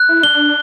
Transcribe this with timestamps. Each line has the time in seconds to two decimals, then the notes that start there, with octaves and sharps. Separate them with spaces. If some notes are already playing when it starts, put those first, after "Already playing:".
Already playing: F#6
0.09 E4
0.23 D4 G7